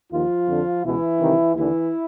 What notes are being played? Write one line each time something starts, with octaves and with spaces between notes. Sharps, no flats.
D#2 D#3 F3 F4
F2 D3
C#2 B2 E3 E4
C2 C3 D#3
D#2 D3 E3 E4